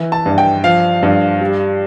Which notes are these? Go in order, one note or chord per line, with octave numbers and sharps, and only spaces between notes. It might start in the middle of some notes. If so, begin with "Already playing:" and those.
Already playing: E3
A5
G2
G5
F3 F5
G2
G3